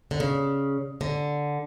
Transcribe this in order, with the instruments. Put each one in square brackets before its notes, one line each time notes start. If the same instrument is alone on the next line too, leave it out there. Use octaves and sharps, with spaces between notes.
[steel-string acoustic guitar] D3
C#3
D3